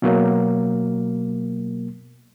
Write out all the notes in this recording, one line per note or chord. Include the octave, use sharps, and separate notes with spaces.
B2 F#3 A#3